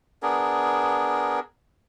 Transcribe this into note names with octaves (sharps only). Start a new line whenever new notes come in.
B3 D4 G#4 A#4